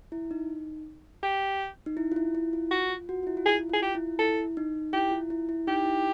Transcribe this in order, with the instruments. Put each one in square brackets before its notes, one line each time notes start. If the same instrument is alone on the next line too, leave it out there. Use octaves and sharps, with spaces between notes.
[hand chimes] E4
D#4
[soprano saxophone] G4
[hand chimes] D#4
E4
F4
E4
E4
F4
[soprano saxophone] F#4
[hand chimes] F4
F#4
F4
E4
F4
[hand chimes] E4 [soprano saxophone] G#4
[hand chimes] F4
[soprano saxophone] G#4
[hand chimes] F4 [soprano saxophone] G4
[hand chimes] E4
[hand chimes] E4 [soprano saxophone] A4
[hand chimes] D#4
[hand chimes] E4 [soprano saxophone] G4
[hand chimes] F4
E4
E4
[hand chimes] D#4 [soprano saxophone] G4
[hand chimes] E4